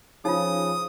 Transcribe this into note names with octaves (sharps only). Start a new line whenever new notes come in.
C#3 F3 D#4 F4 D#6